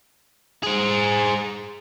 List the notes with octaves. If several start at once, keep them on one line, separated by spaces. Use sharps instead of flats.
G#4 C5